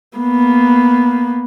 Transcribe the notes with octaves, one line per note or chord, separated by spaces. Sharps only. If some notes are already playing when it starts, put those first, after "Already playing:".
A#3 B3